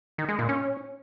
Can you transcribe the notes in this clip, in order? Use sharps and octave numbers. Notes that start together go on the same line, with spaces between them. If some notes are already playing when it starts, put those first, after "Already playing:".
D#3
G#3
A#2
C#4